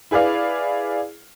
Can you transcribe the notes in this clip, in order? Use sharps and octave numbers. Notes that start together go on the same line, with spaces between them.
E4 G#4 B4 D5 F5